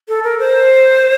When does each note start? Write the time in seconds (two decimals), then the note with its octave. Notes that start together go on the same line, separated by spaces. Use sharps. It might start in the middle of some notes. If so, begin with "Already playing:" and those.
0.08 A4
0.24 A#4
0.39 C5